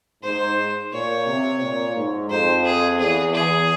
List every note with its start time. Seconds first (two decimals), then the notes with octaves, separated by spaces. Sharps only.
0.23 G#2 C5
0.93 A#2 C#5
1.27 C3
1.61 A#2
1.96 G#2
2.30 F2 C5
2.64 G#4
2.99 E2 G#4
3.33 E2 G#4